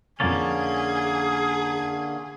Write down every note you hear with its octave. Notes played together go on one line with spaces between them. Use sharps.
F2 D3 A#3 C#4 G#4 A6